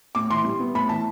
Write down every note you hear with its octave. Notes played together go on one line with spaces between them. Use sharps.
A2 D6
E3 C6
G3
B3
A2 B5
E3 A5